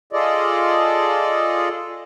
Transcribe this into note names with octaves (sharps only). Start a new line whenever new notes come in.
F4 G#4 A4 D5 D#5